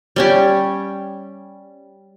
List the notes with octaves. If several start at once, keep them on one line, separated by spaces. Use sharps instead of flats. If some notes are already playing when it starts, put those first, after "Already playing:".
G3 C#4 G4